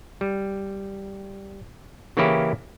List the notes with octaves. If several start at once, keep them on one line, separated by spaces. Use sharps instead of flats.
G3
C#3 E3 A#3 C#4 E4 G4